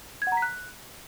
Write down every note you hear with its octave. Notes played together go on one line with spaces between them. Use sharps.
G#6
F#5
A#5
B6
F#6